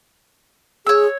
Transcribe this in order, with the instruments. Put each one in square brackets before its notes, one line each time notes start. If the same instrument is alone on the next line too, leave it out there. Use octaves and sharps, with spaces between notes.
[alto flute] G#4 [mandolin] C#5 E6